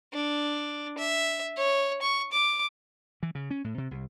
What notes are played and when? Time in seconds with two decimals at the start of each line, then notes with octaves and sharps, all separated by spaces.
0.13 D4
0.98 E5
1.57 C#5
2.02 C#6
2.32 D6
3.23 E3
3.35 C#3
3.51 C#4
3.64 A2
3.78 C3
3.91 C2